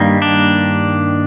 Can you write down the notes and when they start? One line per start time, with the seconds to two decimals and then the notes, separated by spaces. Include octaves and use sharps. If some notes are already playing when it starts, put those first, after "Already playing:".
Already playing: G2 D#3 G3 A#3
0.22 D4